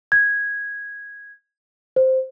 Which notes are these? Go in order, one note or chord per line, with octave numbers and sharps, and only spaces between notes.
G#6
C5